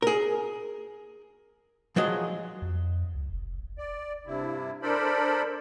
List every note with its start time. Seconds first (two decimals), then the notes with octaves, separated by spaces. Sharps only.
0.02 G#4 A#4
1.96 F3 F#3 G#3 D#5
2.62 F2
3.15 C#2
3.32 F1
3.78 D5
4.26 G2 C3 E4
4.82 D4 A4 A#4 C5 D5 B5